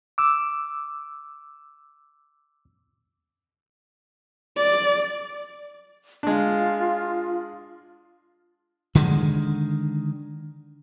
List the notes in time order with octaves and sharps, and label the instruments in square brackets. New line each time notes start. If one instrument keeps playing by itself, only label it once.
[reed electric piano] D6 E6
[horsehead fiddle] D5
[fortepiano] G#3 D4 [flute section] F4
[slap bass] D3 D#3 G#3